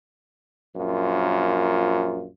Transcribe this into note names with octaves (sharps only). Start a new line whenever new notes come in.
A#1 F#2 F4